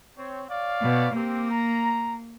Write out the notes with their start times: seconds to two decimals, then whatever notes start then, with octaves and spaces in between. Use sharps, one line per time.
0.18 C4 C#5
0.48 C#5 D5 F5
0.82 B2
1.15 A#3 C4 G4
1.51 A#5